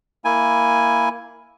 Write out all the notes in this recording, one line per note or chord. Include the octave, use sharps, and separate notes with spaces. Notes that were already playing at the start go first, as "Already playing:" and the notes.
A#3 E4 G#5